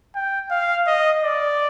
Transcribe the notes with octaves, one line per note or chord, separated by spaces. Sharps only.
G5
F5
D#5
D5